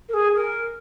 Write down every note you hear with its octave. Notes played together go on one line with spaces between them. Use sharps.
A#4
G#4
A#4